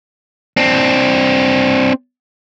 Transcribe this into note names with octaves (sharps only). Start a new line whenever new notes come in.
C4 D4